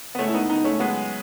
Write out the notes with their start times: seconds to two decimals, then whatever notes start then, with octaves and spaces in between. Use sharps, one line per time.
0.15 B3
0.19 C#2 A3 C#4
0.28 E4
0.34 B3 D#4
0.49 C#2 B3 D#4
0.64 A3 C#4
0.80 F#3 G#3 B3